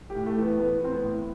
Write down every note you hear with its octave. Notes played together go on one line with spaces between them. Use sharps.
G4
A2
A3
E3 B3
E3 B3
E3 C4
B3
A2